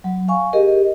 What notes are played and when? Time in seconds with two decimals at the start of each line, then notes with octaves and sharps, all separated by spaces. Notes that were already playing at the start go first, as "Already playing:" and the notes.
0.04 F#3
0.28 F5 G#5 C#6
0.53 G4 G#4 A#4 D#5